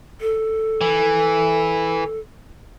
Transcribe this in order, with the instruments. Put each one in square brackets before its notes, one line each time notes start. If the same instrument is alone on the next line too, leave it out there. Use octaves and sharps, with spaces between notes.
[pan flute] A4
[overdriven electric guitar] E3